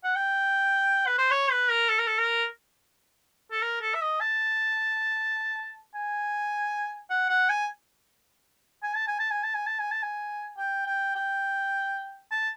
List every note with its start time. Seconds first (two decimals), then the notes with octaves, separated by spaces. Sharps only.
0.04 F#5
0.15 G5
1.06 B4
1.18 C5
1.31 C#5
1.51 B4
1.70 A#4
1.89 A4
1.99 A#4
2.07 A4
2.18 A#4
3.52 A4
3.62 A#4
3.82 A4
3.94 E5
4.02 D#5
4.21 A5
5.95 G#5
7.10 F#5
7.29 F#5
7.49 G#5
8.83 G#5
8.96 A5
9.07 G#5
9.20 A5
9.31 G#5
9.43 A5
9.55 G#5
9.67 A5
9.79 G#5
9.92 A5
10.03 G#5
10.58 G5
10.87 G5
11.16 G5
12.32 A5